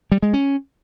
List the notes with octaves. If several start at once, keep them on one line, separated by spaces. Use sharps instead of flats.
G3
G#3
C#4